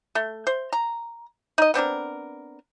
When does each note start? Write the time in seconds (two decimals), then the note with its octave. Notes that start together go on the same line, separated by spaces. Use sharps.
0.15 A3
0.47 C5
0.73 A#5
1.58 D#4 D#5
1.74 B3 C4 D4 A#4